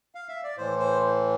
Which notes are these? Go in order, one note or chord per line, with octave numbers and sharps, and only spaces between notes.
F5
E5
D5
A2 E3 C5
C5